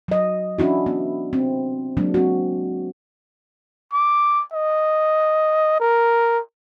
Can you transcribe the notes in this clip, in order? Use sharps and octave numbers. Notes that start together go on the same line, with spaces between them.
F#3 D#5
C#4 D4 E4 F#4
B3
C4
F#3 G#3 A#3 D4
C4 F#4
D6
D#5
A#4